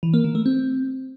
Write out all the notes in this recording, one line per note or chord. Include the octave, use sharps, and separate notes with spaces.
E3
A#3
D#3
A3
C4